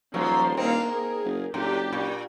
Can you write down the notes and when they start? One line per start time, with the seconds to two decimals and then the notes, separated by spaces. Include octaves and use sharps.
0.14 D#1 F3 F#3 C6
0.57 A#3 C4 D4 D#4 F5
0.88 G#4 A#4
1.25 F#1
1.54 F#1 A2 D4 G4
1.93 A#2